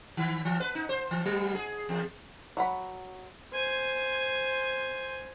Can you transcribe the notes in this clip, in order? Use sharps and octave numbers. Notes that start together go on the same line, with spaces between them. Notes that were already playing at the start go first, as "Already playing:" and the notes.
D#3
E3
B4
D#4
C5
E3
F#3
G#4
E2
F#3 F#5 B5
C5 G#5